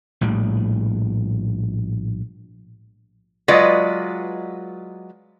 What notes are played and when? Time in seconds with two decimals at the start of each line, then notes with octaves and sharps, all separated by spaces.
0.21 A#1 A2 G3
3.48 F#3 G#3 F4 B4 D5 D#5